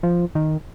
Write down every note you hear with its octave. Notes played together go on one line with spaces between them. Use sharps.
F3
D#3